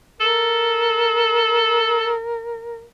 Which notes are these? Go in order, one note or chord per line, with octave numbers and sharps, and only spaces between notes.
A4 A#4